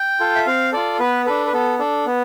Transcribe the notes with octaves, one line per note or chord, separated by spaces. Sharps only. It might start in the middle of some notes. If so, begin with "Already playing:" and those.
Already playing: G5
F4 A4
E5
C4 F5
F4 A4 D5
B3 B4
D4 A4 B4
B4
B3 A4
D4 A4
B3